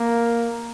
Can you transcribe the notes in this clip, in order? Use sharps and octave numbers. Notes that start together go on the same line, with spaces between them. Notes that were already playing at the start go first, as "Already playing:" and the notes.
Already playing: A#3